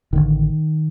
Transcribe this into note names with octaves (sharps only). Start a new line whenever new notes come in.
A1 G2 D3 D#3